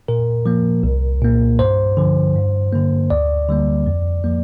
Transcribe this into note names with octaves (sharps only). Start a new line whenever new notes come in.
A#2 A#4
F3 A#3
C2
A#2 A#3
G2 C5
D3 F3
G2
D3 A#3
D2 D5
D3 G3 A#3
F2
F3 A#3